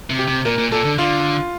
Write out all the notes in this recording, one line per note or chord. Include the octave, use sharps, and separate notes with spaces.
C3
G4
C3
A#2 A#4
A#2
A#2 A4
D3
D3 F4